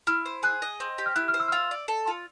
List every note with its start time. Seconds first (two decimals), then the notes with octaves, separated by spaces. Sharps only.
0.07 E4 F6
0.26 C5
0.43 G#4 F#6
0.62 D#5
0.80 C4
0.98 G4
1.06 F6
1.15 E4 F#6
1.28 F6
1.34 C5
1.40 E6
1.48 F6
1.52 F4 E6
1.71 D5
1.88 A4
2.07 F4